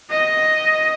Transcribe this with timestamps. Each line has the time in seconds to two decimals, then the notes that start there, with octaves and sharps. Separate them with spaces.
0.11 D#5